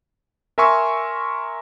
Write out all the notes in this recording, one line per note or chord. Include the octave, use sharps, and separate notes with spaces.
A#4 E5 G#5 C6 C#6 E6